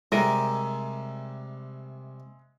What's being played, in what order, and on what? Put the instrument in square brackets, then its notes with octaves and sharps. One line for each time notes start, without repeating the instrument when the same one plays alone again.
[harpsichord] C3 G3 [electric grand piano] G#3 E5 D#7 [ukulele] A#4